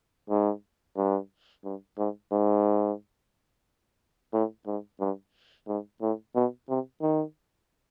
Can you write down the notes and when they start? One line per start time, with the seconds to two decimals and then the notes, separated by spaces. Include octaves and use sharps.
0.30 G#2
0.97 G2
1.64 G2
1.98 G#2
2.32 G#2
4.34 A2
4.67 G#2
5.00 G2
5.68 G#2
6.02 A2
6.35 B2
6.69 C3
7.02 D#3